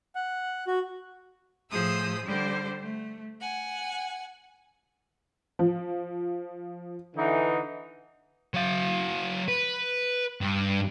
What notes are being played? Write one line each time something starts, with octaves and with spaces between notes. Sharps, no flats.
F#5
F#4
A2 F3 G#4 C5 D#6 E6
D3 G3 C5
A3
F#5 G#5
F3
D3 E3 D#4
F#3 F5
B4
G2